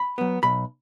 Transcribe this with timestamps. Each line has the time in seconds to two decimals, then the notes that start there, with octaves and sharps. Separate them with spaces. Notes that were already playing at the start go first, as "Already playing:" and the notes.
Already playing: B5
0.18 F#3 B3
0.43 B1 B5